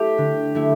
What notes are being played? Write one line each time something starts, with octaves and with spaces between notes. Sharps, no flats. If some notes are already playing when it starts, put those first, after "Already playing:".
Already playing: A3 E4 G4
D3
A3 E4